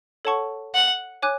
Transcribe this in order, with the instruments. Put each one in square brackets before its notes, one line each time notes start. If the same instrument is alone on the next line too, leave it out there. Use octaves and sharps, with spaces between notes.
[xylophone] A4 C#5 F#5 A5 C#6
[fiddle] F#5
[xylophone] C#5 G#5 D6 F#6